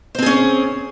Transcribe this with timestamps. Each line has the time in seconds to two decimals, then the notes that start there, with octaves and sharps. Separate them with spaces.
0.15 C5
0.19 C4
0.22 G#4
0.26 C#4